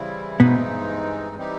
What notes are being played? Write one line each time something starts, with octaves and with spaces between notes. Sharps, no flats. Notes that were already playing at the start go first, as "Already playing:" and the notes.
Already playing: C#3 E3 G3 C4 E4
G2 B2 E3 G#3 B3 C4 D#4
E3 G3 C4 D#4 G4